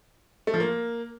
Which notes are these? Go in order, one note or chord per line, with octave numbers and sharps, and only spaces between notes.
A3
F3
A#3